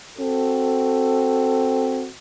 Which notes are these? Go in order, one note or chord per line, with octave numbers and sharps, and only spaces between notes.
C4 F#4 A4